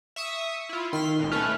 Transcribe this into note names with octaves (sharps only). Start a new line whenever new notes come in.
E5 C#6 D#6
E4 F4
D#3 C6 F6 B6
C#2 A#2
A3 C#4 B4 F6